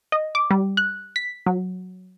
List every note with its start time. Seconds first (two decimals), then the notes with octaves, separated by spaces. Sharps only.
0.12 D#5
0.35 D6
0.51 G3
0.77 F#6
1.16 B6
1.46 F#3